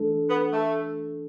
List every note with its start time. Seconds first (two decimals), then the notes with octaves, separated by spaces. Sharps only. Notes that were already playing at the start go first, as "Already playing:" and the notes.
Already playing: E3 A3 D4 A4
0.30 B3
0.53 A3